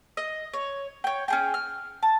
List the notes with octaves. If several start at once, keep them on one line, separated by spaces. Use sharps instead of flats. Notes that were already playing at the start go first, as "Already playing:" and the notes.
D#5
C#5
C#5 G5
C#4 G#4 G5
F6
A5